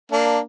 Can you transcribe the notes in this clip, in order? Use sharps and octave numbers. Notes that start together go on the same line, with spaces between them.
A#3 D4